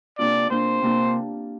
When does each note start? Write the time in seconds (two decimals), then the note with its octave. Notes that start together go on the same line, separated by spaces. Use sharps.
0.18 C3 A#3 D4 F4 D5
0.50 C3 A#3 D4 F4 C5
0.82 C3 A#3 D4 F4